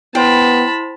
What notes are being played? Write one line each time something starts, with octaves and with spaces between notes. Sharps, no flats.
B3 E4 C5 G5 A5 B5 C6